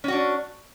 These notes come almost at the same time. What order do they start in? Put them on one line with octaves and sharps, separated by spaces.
C#4 F#4 D4